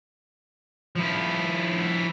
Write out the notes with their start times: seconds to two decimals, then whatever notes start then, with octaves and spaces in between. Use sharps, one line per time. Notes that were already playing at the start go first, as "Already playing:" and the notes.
0.96 F3 E4